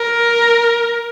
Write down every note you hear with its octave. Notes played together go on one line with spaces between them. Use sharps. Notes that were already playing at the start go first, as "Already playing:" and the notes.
Already playing: A#4